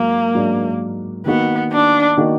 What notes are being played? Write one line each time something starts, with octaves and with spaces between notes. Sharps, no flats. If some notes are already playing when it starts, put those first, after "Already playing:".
Already playing: G#2 F#3 A#3
G#2 F#3 D4
D#3 A#3 B3 D#4 F#4
D4
D#3 A#3 D#4 F#4